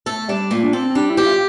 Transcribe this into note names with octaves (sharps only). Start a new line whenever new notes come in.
A3 A4
G3 D4
A#2 A3
D4
C4 A4
C4
G3 D4
E4
G4
F4